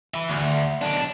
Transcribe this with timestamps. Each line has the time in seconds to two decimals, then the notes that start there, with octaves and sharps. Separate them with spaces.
0.14 B4 E5
0.30 D2
0.82 B1 D4